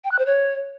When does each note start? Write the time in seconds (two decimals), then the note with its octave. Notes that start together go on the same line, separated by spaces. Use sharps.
0.04 G5
0.11 F#6
0.19 C5
0.26 C#5